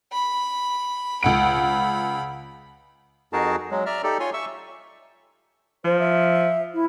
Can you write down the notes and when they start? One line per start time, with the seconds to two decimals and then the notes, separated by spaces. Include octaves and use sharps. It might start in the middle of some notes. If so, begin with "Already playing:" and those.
0.12 B5
1.23 C#2 F#5 B5 D7
3.33 F2 D#4 F#4 G#4 A#4 A5
3.71 F#3 G#3
3.86 D5 E5 A#5 F6
4.04 D#4 G4 A4 D5
4.20 F4 C#5 G#5 C6
4.34 E5 C#6 E6
5.85 F3 C5
6.00 E5
6.74 E4